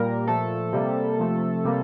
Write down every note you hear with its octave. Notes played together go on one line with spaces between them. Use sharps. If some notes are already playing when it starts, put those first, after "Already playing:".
Already playing: A#2 G3 A#3 A#4
A#2 F3 A3 A4
C3 G3 A#3
C3 F3 A3
C3 G3 A#3